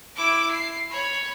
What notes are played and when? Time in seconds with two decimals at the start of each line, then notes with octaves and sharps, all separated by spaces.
0.16 E4 D6
0.51 C7
0.91 C#5 B5